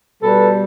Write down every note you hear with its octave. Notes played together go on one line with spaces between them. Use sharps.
B2 G3 A4 B4